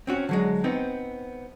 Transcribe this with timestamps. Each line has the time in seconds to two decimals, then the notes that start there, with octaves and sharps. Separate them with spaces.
0.07 C4 C#4 F#4
0.29 D3 F#3 G#3
0.64 B3 C4 D#4